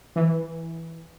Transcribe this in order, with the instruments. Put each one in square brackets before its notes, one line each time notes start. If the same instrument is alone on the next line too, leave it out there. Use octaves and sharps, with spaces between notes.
[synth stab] E3